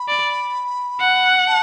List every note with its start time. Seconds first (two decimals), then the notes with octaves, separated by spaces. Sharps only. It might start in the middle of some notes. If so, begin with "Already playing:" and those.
Already playing: B5
0.08 D5
1.00 F#5
1.47 A5